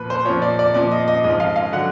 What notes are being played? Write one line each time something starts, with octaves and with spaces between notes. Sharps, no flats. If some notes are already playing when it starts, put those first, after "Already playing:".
Already playing: A#2 F3 B4
C5
A#2 F3 C#5
D5
D5
A#2 F3 D5
D#5
D#5
G#2 F3 D#5
F5
F5
D3 F#3 F#5